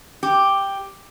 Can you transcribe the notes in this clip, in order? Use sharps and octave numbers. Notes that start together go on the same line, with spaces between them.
G4